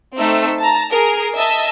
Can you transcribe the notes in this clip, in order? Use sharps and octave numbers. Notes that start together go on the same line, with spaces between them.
A3 C4 D#4 E6
A5 A#5
G#4 A#4
D#5 E5 A5 E6